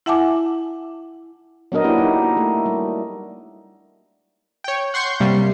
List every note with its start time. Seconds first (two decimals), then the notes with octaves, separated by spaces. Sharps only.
0.06 E4 E5 F#5 G#5 A5 D6
1.72 F#3 B3 D4 A#4 D#5
1.84 A#3 D4 E4 G4
1.98 D#4
2.37 A3
2.66 G3
4.64 C#5 G5
4.94 F#5 C6 C#6 G6
5.20 C3 G3 A#3